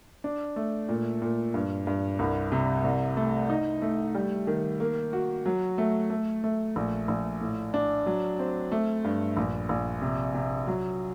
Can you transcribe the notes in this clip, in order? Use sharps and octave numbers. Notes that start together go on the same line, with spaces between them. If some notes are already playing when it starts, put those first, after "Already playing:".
D4
A3
A#2
A#2
G2
G2
C2
C3
C2
A3
D#4
A3
G3
D#3
A#3
F#4
F#3
A3
A3
A3
A#1
A#1
A2
D4
F#3
C4
A3
G2
A#1
A#1
C3
C3
F#3